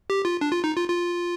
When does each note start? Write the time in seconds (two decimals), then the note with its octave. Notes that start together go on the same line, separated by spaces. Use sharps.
0.10 G4
0.25 F4
0.41 D4
0.52 F4
0.64 D#4
0.76 F4
0.89 F4